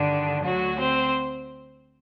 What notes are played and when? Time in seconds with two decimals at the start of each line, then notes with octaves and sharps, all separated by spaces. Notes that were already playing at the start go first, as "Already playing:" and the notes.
Already playing: G2 D3 D#3 D4
0.44 D2 D3 F#3 F#4
0.79 C4 C5